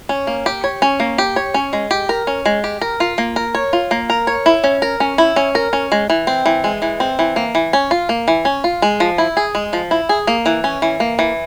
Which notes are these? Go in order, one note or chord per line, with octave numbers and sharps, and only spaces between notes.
C#4
A#3
G4
C#5
C#4
A#3
G4
C#5
C#4
G#3
G4
A#4
C#4
G#3
G4
A#4
F4
A#3
A#4
C#5
F4
A#3
A#4
C#5
E4
C#4
A#4
C#4
E4
C#4
A#4
C#4
G#3
E3
C4
E3
G#3
E3
C4
E3
A#3
E3
C#4
F4
A#3
E3
C#4
F4
G#3
F3
E4
G#4
G#3
F3
E4
G#4
A#3
E3
C#4
E3
A#3
E3